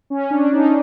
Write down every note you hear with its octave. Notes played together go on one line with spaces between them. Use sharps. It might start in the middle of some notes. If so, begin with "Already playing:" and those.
C#4
D4
D#4